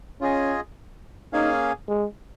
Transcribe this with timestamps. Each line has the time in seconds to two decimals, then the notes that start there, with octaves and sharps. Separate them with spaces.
0.21 C#4 F4 G#4 D#5 G#5
1.33 A#3 C#4 D#4 G#4 F5 G#5
1.88 G#3